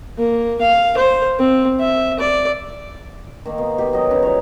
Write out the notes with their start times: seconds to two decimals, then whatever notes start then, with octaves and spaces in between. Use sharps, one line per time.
0.18 A#3
0.61 F5
0.97 C5
1.39 C4
1.79 E5
2.19 D5
3.46 D#3 A#3
3.58 B2
3.78 B2 G4
3.93 F#3 D#5
4.11 C#3 D#4 B4
4.23 G3 F4 C#5